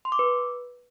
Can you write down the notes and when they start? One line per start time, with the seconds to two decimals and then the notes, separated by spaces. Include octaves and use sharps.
0.05 C6
0.12 D6
0.19 B4